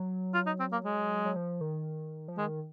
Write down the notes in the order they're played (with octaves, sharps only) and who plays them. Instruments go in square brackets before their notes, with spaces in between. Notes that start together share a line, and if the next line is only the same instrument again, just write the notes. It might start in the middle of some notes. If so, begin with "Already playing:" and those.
Already playing: [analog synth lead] F#3
[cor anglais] F4
D#4
C4
A#3
G#3
[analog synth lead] F#3
F3
D#3
F3
[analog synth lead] D#3 [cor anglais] G#3